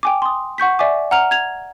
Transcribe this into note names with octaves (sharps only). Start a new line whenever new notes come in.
G5 G#5 D6
C6 D#6
F#5 C#6 G6 B6
D5 E5 G#5 D6
F#5 A#5 F6 F7
G#6 F7